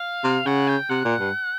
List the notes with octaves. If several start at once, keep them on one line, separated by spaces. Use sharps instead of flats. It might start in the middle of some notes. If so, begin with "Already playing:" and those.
Already playing: F5
C3
C#3 F#5
G5
C3 F#5
A#2
G2